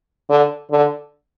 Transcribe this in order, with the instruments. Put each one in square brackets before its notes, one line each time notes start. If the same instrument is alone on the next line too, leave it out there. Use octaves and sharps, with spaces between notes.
[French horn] D3
D3